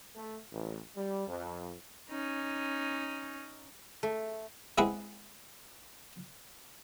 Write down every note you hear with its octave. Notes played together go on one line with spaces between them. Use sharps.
A3
A1
G3
F2
C#4 D#4
A3
G#3 C4 E4 G#4 B4 F#5